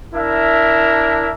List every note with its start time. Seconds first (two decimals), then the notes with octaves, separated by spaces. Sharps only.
0.15 D4 E4 A#4 E5